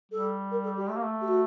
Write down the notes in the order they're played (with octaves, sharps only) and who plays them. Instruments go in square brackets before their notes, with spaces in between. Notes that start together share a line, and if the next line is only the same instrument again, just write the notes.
[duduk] G3 [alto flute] A4
[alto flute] A#4
A4
G4
[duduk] A3
A#3
A3
[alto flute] G4
F#4